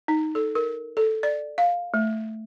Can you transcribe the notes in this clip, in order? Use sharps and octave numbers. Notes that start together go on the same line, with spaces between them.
D#4
A4
A#4
A4
D5
F5
A3